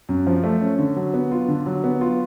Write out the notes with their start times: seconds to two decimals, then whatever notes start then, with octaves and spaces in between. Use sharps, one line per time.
0.09 F#2
0.27 F3
0.44 A3
0.61 C#4
0.79 D3
0.96 F#3
1.14 B3
1.32 F4
1.48 D3
1.66 F#3
1.84 B3
2.01 F4